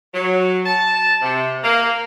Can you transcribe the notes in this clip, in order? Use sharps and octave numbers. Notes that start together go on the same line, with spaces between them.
F#3
A5
C3
A#3